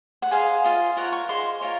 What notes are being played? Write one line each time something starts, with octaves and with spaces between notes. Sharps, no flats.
F#5
G#4 C5 D#5 F5
F4 C5 D#5
F4 A#4 C#5 F#5
C#6
D#4 G#4 C5 C6
F4 A#4 C#5